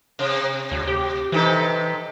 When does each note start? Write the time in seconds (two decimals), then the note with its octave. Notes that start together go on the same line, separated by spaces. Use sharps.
0.19 C3
0.71 D2
0.87 G4
1.32 C3 E3 D#4 A4